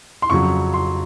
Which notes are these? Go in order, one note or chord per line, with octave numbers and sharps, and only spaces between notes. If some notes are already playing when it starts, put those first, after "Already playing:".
C6
F2 C#3 F#3 C#6
C6